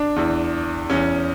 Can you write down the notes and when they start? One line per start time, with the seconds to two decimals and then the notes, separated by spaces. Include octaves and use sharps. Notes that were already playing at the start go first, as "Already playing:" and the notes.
Already playing: D4
0.16 E2 E3
0.90 E2 E3 C#4